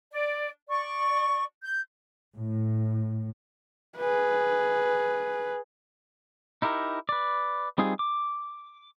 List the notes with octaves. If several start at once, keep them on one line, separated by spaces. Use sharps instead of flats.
D5
D5 C#6
G6
A2
G#4 B4
D#4 E4 G4 A#4
B4 D5
G3 C4 D#4 F4 G#4
D6